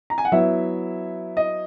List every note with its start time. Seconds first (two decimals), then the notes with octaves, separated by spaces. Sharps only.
0.10 A#5
0.18 G#5
0.25 F#5
0.32 F#3 B3 E4 E5
1.37 D#5